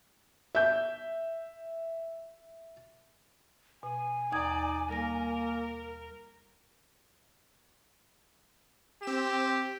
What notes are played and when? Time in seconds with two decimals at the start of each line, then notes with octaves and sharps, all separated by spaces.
0.55 E5 G6
3.83 B2 G#5
4.32 D#2 D#4 D5 D#6 G#6
4.89 G3 A#3 A#4 A#6
9.03 C4 G4 E7